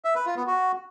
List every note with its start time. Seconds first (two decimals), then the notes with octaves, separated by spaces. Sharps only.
0.05 E5
0.15 B4
0.26 F4
0.37 B3
0.47 F#4